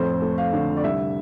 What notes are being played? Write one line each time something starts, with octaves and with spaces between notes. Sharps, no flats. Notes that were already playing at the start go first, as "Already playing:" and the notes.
Already playing: F2 A2 C5
A3
F5
D3
D5
C2 E5